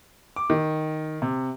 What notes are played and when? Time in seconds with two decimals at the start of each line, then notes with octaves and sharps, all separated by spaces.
0.36 D6
0.50 D#3
1.22 C3